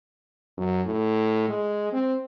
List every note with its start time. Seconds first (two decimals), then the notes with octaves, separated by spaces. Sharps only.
0.57 F#2
0.86 A2
1.49 G#3
1.93 C4